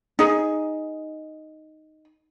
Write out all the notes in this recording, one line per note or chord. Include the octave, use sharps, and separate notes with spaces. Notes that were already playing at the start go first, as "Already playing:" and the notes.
D#4 G#4